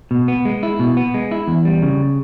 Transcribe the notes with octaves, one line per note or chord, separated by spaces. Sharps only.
B2
B3
G#3
E4
B2
B3
G#3
E4
E2
G3
C#3